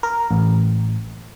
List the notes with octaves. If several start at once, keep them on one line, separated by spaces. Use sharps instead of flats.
A#4
A1